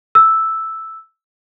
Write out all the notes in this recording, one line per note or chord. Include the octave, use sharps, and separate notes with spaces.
E6